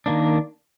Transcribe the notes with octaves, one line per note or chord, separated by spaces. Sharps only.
D#3 A#3 D4